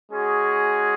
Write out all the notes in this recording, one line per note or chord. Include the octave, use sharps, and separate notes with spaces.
G#3 C#4 F#4 G#4